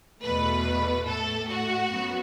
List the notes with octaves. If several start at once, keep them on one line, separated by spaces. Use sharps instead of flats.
E2 B2 A3 B4
A2 A3 A4
F#4
F#2 B3